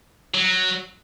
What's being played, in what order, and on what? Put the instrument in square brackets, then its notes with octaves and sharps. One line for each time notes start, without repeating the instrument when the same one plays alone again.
[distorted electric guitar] F#3